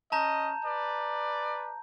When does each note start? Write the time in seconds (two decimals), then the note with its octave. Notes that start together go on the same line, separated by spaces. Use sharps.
0.12 C#4 D#5 A5 A#5 G6
0.64 B4 D5